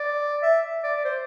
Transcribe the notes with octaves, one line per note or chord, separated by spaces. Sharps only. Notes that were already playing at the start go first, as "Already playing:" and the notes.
Already playing: D5
E5
D5
C5